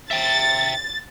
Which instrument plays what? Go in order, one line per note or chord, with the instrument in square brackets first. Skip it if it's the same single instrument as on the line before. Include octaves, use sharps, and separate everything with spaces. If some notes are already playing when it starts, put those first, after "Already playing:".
[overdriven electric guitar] E5 G5 [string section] A6